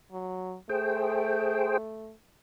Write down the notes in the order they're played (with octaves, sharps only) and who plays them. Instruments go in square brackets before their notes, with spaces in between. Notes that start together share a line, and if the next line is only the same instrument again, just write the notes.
[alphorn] F#3
[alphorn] A3 [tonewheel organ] G#4 C5 G5